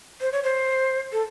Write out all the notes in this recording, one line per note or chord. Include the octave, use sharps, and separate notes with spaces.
C5
C#5
C5
A4